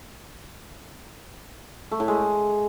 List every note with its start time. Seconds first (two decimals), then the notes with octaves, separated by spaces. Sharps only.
1.91 A3
2.00 A2
2.08 G#3